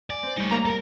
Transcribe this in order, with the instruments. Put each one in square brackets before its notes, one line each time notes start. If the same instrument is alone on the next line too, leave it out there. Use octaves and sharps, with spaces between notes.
[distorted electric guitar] D5 [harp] G#5
[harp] C4 C5
[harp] G3 A3 [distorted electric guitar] D#4 C#5
[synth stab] A#3 A#5
[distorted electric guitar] A4 A#4